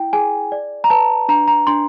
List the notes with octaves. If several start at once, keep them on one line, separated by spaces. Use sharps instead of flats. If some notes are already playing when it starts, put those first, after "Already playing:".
Already playing: E4 G5
G#4 G#5
D5
A#5
B4 A5
D4 A#5
A#5
D4 C6